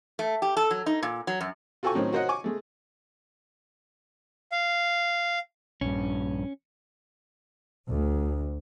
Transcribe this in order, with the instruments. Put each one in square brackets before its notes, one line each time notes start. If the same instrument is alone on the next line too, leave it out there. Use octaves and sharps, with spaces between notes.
[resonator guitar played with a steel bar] A3
G4
A4
F#3
D#4
A#2
F#3
F#2
[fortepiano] F4 F#4 A4 G5 G#5 C#6
A2 D#3 F#3 C4 C#4 D#4
F#4 A#4 C5 C#5 D#5 F#5
G#5 C#6 D6
G#3 A3
[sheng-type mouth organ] F5
[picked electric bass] A#1 G2 [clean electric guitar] C#4
[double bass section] D2